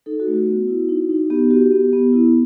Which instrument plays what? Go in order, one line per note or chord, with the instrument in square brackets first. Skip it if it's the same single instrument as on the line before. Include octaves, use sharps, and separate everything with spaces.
[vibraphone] D#4 A4
F#4
A3
F#4
B3
E4
D#4
D#4
B3 G4
F#4 G4
B3
B3
E4